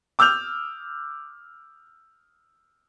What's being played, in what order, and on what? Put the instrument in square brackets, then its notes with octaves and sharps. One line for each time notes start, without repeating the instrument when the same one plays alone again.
[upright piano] D6 E6 F6 G6 F7